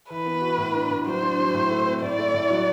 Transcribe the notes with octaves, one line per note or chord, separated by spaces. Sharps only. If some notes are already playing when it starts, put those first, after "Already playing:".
E3 B4
B3
F#4
A2
D4
A2
F#3 C5
D4
F#3
A2
A3
C4
A2 D5
A3
A2
F#3